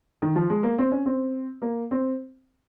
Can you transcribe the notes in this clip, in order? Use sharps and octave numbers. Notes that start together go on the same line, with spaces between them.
D#3
F3
G#3
A#3
C4
C#4
C4
A#3
C4